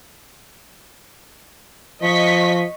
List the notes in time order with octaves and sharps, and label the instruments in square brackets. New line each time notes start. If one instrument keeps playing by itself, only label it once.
[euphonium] F3 [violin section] D#5 C#6 B6